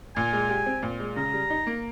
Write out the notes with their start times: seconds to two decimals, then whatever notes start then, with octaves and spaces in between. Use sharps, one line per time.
0.16 A#2 G#5
0.33 G#3
0.49 G4
0.66 C4
0.83 A#2
1.00 G#3
1.16 C#3 A#5
1.34 G3
1.50 D#4
1.67 A#3